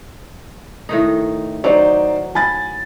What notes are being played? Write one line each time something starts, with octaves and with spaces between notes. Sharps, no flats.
A2 D#3 D#4
F#3 D#4 C5 D5
G#5 B5 A6